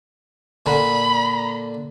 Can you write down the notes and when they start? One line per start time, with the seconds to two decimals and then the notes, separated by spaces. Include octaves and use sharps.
0.66 A#2 D3 B5